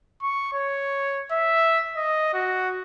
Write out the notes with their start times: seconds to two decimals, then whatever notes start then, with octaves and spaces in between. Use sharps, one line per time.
0.23 C#6
0.53 C#5
1.32 E5
1.97 D#5
2.34 F#4